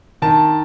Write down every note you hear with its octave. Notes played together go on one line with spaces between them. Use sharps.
D#3 A5